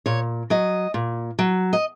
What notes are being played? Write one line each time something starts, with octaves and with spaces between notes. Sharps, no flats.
A#2 C#5
F#3 D#5
A#2
F#3
D#5